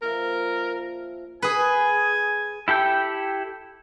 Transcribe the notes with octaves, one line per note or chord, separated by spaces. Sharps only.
A#2 F3 A#4 E5
G#4 B4 G#5
E4 G4 A4 G5